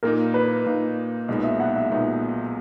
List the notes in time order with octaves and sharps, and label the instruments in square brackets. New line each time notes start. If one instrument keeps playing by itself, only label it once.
[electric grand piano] A#2 A#3 D#4 [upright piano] A#4
[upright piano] B4
[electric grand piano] A#2 A#3 D#4
[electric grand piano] B1 A#2 G#3 B3 D#4 [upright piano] D#5
[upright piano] E5
F#5
E5
[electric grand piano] B1 A#2 G#3 B3 D#4